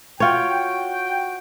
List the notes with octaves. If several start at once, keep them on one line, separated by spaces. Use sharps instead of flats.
F4 F#4 C#5 G5